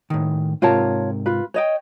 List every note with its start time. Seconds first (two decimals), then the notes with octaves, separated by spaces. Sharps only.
0.10 A2 D#3
0.62 G#2 C3 F4 A#4 C#5 A5
1.26 F4 B4
1.54 C#5 D#5 G5